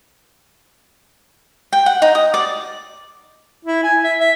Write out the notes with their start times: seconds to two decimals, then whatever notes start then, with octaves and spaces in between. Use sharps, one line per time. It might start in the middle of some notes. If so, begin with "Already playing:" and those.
1.73 G5
1.86 F#5
2.02 D#4
2.15 D#6
2.34 D5
3.65 E4
3.83 G#5
4.03 E5
4.18 E5